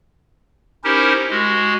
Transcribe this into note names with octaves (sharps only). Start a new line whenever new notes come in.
C#4 D#4 E4 G4 A#4 C5
G#3 F#4